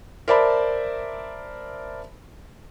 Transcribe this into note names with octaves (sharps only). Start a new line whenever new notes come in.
A#4 C5 D5 E5 A5 B5